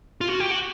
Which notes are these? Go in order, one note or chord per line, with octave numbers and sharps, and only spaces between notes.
F4
F#4
G4
F#4